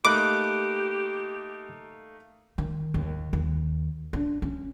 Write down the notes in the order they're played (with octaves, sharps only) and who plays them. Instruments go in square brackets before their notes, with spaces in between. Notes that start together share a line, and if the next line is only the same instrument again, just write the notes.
[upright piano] A3 A#3 D#4 [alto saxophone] G4 [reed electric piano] B5 F#6 [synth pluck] D6
[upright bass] D#3
D#2
D#2
D4
C#4